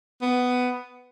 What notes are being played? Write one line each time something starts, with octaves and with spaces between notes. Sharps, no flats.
B3